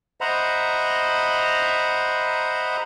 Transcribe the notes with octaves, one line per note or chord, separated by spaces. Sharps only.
C5 D#5 E5 F#5 A#5 B5